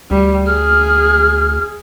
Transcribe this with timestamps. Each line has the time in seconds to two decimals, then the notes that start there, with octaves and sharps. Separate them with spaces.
0.11 D2 G3
0.46 G#4 F6